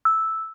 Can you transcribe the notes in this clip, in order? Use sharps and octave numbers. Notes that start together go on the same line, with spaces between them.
E6